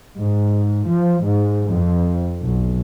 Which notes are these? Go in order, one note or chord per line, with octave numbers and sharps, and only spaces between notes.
G#2
F3
G#2
F2
B1